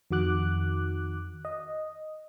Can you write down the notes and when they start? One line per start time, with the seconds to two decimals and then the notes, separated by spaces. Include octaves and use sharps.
0.11 F2 D#3 F#4 D6 F#6
1.45 D#5